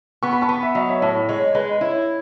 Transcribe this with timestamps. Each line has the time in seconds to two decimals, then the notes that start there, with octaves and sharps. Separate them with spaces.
0.23 B3 C#6
0.33 B5
0.42 A5 C#6
0.49 B3
0.63 E5
0.75 F#3 D#5
0.89 C#5 E5
1.02 A2 C#5
1.29 G#3 C#5
1.55 G#3 B4
1.81 E4 C#5